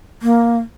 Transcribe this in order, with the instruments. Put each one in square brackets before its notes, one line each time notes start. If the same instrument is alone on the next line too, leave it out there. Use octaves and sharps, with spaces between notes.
[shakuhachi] A#3